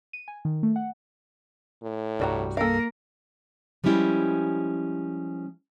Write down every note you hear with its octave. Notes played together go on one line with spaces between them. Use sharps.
D#7
G#5
D#3
A3
F#5
A2
C2 G2 G3 F#4 A#5
A#3 A4 A#4 F5
F3 G3 G#3 C#4 E4 G4